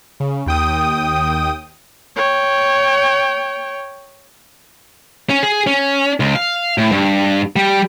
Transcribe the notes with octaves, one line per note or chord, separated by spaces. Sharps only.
C#3
D#2 G5 D#6
C#5 G5
C#4
G#4
C#4
C#2
F5
A2
G2
G3